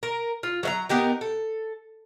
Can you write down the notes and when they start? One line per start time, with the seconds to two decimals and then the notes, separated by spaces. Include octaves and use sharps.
0.03 A#4
0.43 F4
0.63 F#3 E5 A#5
0.89 B3 D#4 G4 A#4
1.21 A4